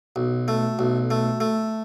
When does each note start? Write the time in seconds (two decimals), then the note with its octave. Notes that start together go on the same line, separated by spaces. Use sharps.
0.16 B1
0.48 A3
0.79 B1
1.11 A3
1.40 A3